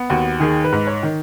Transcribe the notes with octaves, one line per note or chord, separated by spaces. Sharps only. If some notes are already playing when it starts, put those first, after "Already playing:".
Already playing: B3
D#2 F#4
D#3 G#4
B4
G#2
C#5
D#3